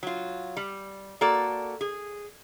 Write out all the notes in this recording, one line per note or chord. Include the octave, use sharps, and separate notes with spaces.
F#3 F4
G3
A#3 F#4 A4 D5
G#4